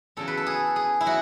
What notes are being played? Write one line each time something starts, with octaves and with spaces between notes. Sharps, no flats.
E2 C#3 F#3 A4
B4
A4
G#4
G#4
E4
F#3 F#4